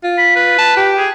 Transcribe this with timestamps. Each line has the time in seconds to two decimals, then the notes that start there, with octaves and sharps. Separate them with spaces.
0.04 F4
0.18 B5
0.36 B4
0.58 A5
0.77 G4
0.98 G#4